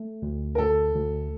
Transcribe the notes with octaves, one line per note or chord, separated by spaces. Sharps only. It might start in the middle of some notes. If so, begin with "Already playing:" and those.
Already playing: A3
D2
A#4
D2 A4
D2